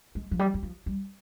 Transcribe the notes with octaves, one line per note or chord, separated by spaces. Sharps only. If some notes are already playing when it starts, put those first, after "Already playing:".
G#3
F3
G3
G3
F3
G3